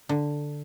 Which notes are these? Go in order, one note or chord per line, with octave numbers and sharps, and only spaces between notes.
D3